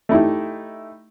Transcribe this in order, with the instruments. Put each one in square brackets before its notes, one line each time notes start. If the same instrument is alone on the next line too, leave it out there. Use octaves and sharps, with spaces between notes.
[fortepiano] A3 D#4 E4 G4